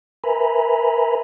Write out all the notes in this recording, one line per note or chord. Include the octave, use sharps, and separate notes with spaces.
A#4 B4 E5 G#5 A#5 B5